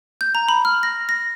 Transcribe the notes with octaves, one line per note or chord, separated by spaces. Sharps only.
G6
A#5
B5
F6
A#6
A#6